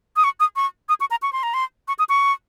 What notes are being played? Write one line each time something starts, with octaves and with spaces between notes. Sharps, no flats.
D#6
C#6
D#6
C#6
D#6
C#6
A#5
C#6
C6
A#5
C6
C#6
D#6
C#6